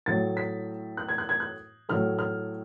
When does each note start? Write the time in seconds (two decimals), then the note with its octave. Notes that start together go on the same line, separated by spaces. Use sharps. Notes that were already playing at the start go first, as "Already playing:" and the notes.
0.06 A2 F#3 A3 A6
0.37 B6
0.97 F#6
1.09 G#6
1.18 F#6
1.29 G#6
1.40 F#6
1.89 A2 F#3 A3 F6
2.19 F6